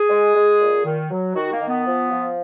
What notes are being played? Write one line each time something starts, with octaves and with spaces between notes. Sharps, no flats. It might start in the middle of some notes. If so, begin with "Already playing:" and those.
Already playing: G#4
G#3
G#3
A#2
D#3
F#3
D#3 F#4
A#3
D#3
B3
F3
F3